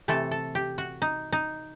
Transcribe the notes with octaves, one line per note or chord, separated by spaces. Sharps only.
C3 E3 A3 A4
A4
G4
F#4
D#4
D#4